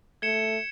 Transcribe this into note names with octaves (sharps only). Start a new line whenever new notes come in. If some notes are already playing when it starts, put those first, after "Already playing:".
A3 G#6 C#7 E7 G7